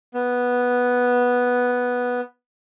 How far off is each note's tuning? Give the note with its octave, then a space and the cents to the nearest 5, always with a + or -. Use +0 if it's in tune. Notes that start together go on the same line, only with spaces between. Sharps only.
B3 -5